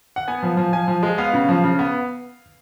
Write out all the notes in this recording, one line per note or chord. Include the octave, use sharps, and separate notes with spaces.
F#5
B3 G#5
F3
F3
F3 G#5
F3
G#3
B3 F5
C#3
F3
C#3
B3